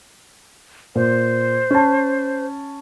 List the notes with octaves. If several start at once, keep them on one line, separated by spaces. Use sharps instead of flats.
A#2 C5
C#4 A5